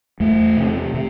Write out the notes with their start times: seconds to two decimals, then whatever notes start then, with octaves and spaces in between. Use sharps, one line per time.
0.20 E2 A3
0.57 C3
0.94 C3